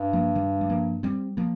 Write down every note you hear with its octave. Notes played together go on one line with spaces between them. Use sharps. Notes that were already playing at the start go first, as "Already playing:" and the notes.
Already playing: G2
F3 A#3
D#3 G3
G3
F3 A#3
G3 C4
F3 A#3